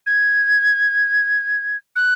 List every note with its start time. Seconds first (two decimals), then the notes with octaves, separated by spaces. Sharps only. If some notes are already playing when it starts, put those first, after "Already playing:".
0.06 G#6
1.96 F#6